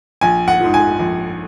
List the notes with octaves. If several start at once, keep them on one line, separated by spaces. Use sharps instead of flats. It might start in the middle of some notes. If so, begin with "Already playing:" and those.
A#1 G#5
F#5
G#2 F3
G#5
A#1